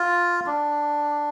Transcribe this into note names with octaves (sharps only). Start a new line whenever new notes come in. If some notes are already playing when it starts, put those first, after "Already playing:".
Already playing: F4
D4